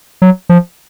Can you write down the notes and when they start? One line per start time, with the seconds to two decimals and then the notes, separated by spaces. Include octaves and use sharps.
0.22 F#3
0.49 F3